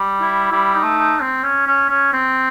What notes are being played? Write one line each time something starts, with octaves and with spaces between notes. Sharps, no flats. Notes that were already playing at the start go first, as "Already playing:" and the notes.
Already playing: G3
E4
G3 E4
D#4
A3
D#4
C4
C#4
C#4
C#4
C4